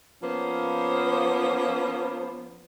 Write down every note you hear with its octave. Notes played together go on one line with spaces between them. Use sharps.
F3 A#3 B3 C#4 C5